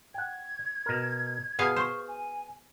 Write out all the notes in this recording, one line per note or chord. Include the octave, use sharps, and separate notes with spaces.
F#5 G5 G#6
B2 A#4
B2 G#4 B4 F5
C5 C#6
G#5